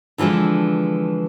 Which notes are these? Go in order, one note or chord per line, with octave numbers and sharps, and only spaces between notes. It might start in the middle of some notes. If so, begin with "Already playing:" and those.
D3 E3 F3 G#3 D4